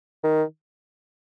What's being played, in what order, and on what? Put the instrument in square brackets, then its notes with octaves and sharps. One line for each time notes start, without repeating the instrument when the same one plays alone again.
[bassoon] D#3